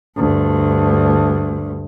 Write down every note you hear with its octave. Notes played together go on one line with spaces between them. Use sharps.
D2 G2